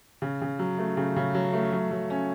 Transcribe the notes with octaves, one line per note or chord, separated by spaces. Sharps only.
C#3
C#3
F#3
A3
C#3
C#3
F#3
A3
F#3
F#3
C#4